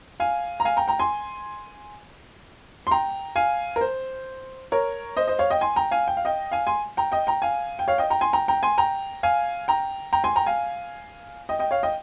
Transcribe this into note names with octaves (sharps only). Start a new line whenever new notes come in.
F5 G#5
A#5
F5 G#5
G5 A#5
G5 A#5
G#5 C6
C6
G5 A#5
F5 G#5
A#4
C5
A#4 C#5
C5 D#5
C5 D#5
C#5 F5
D#5 G5
G#5 C6
G5 A#5
F5 G#5
G5
F5
D#5 G5
F5 G#5
G#5 C6
G5 A#5
D#5 G5
G5 A#5
F5 G#5
G5
C#5 F5
D#5 G5
G5 A#5
G#5 C6
G5 A#5
G5 A#5
G#5 C6
G5 A#5
F5 G#5
G5 A#5
G5 A#5
G#5 C6
G5 A#5
F5 G#5
D#5 G5
D#5 G5
C#5 F5
D#5 G5